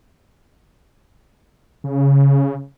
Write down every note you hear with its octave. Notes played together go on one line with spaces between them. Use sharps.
C#3